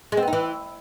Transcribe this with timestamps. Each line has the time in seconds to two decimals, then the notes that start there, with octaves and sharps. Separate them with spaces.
0.12 G#3
0.17 C4
0.22 B3
0.28 D#4
0.33 E3